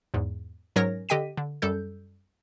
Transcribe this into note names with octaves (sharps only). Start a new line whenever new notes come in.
E2 G#2
G#2 F#3 C#4 A#4 C#5 A#6
D3 G4 D#5 G5 B6 D#7
D3
F#2 G3 A4 G6